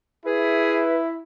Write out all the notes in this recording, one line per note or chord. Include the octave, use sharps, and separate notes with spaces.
E4 G#4 B4 E5